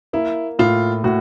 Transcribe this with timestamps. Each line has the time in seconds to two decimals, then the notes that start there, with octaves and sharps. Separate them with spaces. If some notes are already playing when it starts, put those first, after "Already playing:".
0.13 A#3 E4
0.59 A2 F4
1.04 A2 F#4